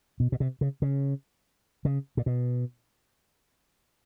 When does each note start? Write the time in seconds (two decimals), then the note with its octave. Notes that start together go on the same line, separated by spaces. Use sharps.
0.20 B2
0.32 B2
0.40 C3
0.61 C#3
0.82 C#3
1.85 C#3
2.17 A#2
2.26 B2